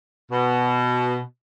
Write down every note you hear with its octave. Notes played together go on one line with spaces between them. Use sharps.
B2